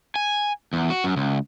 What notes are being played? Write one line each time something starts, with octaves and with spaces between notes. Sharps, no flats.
G#5
E2
F#4
F#2
C#2